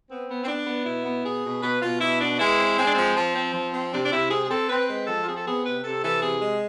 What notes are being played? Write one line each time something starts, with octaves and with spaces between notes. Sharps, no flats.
B3 C4
B3
C4
B3 D4
B3
B2 E4
B3
B2 G#4
B2
B2 B4
B2 F4
B2 E4
B3 D4
G#3 E4
C4
G#3 C4
D4
F3 C4
F3
C4
F3
C4
C3 D4
D4
C3 E4
C4 G#4
G#4
C4 A4
C4 B4
G#3 B4
F3 A4
F4
C4 G#4
A4
B3 G#4
C3 B4
C3 A4
E3 A4
C3 G#4
G#3